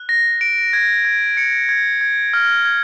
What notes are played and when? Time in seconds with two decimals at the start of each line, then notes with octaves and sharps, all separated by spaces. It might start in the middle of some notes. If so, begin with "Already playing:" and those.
Already playing: F#6
0.09 A#6
0.41 D7
0.73 G#6
1.05 G#6
1.37 C#7
1.69 G#6
2.01 G#6
2.33 F6
2.65 G#6